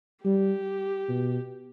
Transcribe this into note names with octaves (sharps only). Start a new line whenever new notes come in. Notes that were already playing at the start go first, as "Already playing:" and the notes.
G3 G4
B2